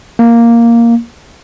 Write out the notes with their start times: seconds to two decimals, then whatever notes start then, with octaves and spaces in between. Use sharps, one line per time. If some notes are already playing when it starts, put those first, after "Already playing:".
0.19 A#3